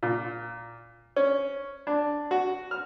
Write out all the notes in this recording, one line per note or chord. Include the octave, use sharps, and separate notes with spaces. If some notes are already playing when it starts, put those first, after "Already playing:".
A#2
C#4
D4
F#4
F6